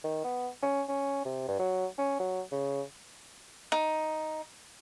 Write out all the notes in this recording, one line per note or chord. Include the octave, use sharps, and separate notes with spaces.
D#3
B3
C#4
C#4
C3
G2
F#3
C#4
F#3
C#3
D#4